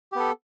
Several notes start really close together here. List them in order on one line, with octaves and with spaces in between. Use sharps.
G4 B3 A4